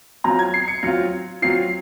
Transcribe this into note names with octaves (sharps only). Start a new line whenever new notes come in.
F#3 C4 F4 A#5
G#6
C7
C#7
F#3 C4 F4
F#3 C4 F4 C7